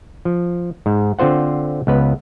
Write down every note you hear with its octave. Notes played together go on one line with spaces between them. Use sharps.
F3
G#2
D3 C4 F4 C5 F#5
C#2 B3 B4